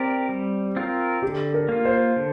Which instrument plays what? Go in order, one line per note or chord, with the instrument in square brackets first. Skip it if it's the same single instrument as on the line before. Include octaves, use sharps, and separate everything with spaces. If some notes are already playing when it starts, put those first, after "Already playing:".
Already playing: [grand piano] C4 [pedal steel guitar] G4 A#4 D5
[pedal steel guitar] G3
C4 F4 A#4
[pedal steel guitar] D3 [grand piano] G4
[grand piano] A#4
[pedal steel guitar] A#3 F4
[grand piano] C5
[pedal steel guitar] D3